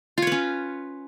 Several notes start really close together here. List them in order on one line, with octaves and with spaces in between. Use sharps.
F4 C#5 B4 C#4